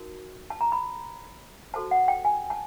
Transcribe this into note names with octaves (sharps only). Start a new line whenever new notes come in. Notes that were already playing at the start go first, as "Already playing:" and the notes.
Already playing: D#4 F#4 A#4
A5
A#5
B5
F#4 A4 C5 A5
F#5
G5
G#5
A5